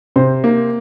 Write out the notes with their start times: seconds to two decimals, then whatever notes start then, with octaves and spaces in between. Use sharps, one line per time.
0.16 C3 C5
0.44 A#3